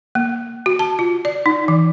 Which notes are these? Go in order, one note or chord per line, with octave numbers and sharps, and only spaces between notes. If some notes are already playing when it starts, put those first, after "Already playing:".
A#3
F#4
A5
F4
D5
D#4
E3